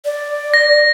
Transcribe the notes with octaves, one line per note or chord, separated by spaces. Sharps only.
D5
A#6